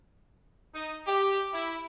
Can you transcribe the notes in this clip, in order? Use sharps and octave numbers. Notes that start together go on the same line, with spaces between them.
D#4
G4
E4